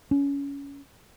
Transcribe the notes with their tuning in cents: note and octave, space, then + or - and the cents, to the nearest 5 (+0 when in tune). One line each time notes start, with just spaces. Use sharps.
C#4 +20